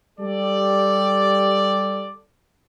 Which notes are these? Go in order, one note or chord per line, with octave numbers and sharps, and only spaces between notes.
G3 G4 A4 D5